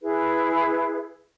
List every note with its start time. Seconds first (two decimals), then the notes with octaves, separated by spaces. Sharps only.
0.02 E4 G#4 B4